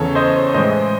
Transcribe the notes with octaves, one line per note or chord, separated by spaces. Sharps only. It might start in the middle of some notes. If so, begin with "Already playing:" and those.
Already playing: E2 C#3 E3 A4 C#5
C5 D#5
A2 E3 G#3 C5 D#5